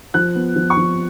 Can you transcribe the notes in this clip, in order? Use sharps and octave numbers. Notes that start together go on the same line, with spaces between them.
F3 F#6
B3
F3
C#6
F3